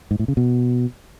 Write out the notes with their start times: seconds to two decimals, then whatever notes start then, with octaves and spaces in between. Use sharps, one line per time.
0.11 G#2
0.19 A2
0.28 C#3
0.37 B2